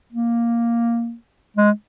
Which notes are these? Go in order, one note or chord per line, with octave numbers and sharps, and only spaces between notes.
A#3
G#3